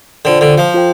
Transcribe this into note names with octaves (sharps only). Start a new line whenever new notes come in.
D3 F4 C5 G5
D3
F3
F4 A4 C5 G5